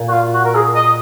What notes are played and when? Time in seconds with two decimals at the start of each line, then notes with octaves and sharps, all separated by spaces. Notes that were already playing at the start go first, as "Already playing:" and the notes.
Already playing: A#2
0.08 F#4
0.12 F4
0.34 F#4
0.45 A#4
0.55 G#4
0.75 D#5